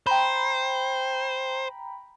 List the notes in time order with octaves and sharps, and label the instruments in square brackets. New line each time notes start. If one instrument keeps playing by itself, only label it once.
[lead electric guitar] C5 [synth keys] G5 A#5 B5